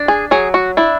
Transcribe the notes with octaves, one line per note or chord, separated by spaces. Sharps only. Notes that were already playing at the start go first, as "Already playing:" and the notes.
Already playing: D4
G#4
F#3 G#4
F#4
D4 E4